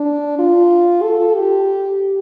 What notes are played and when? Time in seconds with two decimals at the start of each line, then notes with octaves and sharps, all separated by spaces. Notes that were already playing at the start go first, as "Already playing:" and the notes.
Already playing: D4
0.39 F4
1.03 A4
1.35 G4